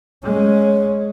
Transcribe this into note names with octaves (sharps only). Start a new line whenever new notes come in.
G#3 C#4 C#5